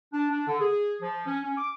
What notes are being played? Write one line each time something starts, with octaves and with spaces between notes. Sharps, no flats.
D4
D4
D3
G#4
F3
C#4
C#4
D6